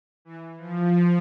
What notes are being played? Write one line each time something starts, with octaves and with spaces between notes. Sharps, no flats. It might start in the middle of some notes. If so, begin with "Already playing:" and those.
E3
F3